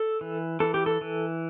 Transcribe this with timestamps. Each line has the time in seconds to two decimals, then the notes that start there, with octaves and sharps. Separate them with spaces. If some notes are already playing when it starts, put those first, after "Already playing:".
Already playing: A4
0.21 E3
0.60 E3 A4
0.74 G4
0.86 A4
1.01 E3